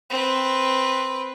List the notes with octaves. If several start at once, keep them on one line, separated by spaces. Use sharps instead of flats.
C4 B4